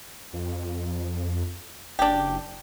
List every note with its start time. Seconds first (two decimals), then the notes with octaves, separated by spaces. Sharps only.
0.33 F2
1.99 F#1 D4 G4